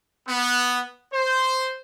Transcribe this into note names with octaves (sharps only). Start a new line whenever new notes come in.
B3
C5